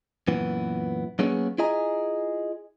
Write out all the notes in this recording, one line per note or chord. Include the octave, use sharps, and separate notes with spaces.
F#2 A#2 E3 B3
F#3 A#3 B3 C#4 G#4 C#5
E4 F4 G#4 D#5 G#5 A#5